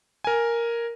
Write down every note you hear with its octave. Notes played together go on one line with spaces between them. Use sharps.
A#4 G#5